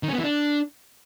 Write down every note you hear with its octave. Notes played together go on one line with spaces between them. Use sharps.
D#3
C#4
B3
E3
D4